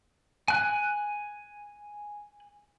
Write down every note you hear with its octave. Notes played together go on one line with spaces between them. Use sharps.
G#5 F#6